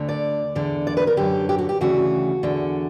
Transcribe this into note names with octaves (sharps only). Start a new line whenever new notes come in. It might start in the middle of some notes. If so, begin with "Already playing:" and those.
Already playing: D2 D3
D5
E2 D3
D5
B4
A#4
F#2 D3 G4
G4
F#4
G4
D2 C#3 E3 F#4
E2 D3